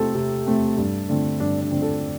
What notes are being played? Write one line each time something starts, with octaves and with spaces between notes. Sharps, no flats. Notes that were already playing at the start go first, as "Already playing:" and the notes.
Already playing: C3 A3 C4 A4
C3
A3 C4
G2
D3 A3 C4
G2 D4
D4
D3 A3 C4
A4